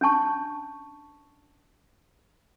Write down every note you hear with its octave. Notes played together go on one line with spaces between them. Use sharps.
C#4 D4 A5 C#6